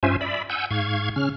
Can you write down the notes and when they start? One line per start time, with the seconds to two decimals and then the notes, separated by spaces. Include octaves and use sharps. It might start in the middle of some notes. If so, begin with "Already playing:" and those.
0.03 G2 C#4 F4 C5 E5 G#5
0.21 D5 E5 B5
0.50 F#5 G#5 E6 G6
0.71 G#2 F5 C#6 G#6
1.16 C#3 C#4 F6